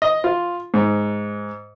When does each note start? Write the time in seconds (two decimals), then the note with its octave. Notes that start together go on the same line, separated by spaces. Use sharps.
0.02 D#5
0.24 F4
0.74 G#2